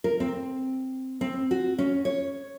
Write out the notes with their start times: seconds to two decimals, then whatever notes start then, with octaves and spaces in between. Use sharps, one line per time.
0.04 A#4
0.20 C4
1.21 C4
1.51 F#4
1.78 C#4
2.05 C#5